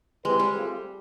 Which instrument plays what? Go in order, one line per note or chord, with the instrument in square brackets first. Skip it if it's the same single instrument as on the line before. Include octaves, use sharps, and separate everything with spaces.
[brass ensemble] G3 C4 E4 G4 B4 [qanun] G#3
[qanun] G3
[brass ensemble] A3 C4 F4 G#4